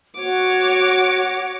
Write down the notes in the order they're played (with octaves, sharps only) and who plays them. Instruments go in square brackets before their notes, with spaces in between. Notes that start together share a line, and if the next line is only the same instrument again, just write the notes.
[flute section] F#4 F#5 [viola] C#5 D6